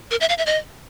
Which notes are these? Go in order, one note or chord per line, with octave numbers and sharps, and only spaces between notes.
A#4
E5
F5
E5
D#5